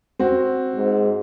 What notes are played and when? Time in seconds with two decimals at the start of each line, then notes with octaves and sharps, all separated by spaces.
0.19 C4 F#4
0.74 G#2